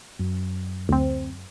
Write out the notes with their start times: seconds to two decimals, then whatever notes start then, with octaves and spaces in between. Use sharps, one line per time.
0.19 F#2
0.89 D2 C4